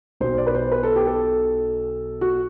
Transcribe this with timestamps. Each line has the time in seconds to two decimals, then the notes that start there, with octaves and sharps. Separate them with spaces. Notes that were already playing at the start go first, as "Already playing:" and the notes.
0.20 B1 B2 C5
0.38 D5
0.46 B4
0.55 C5
0.72 B4
0.83 A4
0.96 G4
1.07 A4
2.21 F#4